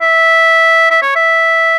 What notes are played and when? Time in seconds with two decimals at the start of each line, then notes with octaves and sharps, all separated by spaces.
0.01 E5
0.91 E5
1.02 C#5
1.16 E5